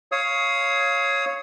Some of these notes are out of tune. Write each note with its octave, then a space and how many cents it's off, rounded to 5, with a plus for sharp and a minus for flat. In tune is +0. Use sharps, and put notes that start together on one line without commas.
C#5 +0 F5 -5 D#6 +30